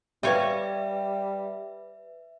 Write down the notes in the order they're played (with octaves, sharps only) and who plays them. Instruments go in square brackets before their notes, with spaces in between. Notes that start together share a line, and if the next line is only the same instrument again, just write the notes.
[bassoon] G3 [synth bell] B4 E5 [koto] C#5 F5 G5